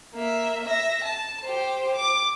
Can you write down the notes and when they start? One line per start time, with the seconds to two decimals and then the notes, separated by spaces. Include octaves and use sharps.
0.14 A#3 E5
0.65 E5 A#6
1.03 A5
1.45 G4 C5
1.95 D6